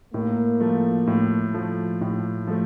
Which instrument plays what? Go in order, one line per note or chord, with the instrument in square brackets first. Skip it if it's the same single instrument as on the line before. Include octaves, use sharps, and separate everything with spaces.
[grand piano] A2 [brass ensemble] A#3
[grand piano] F3 A3
A2
F3 A3
A2
F3 A3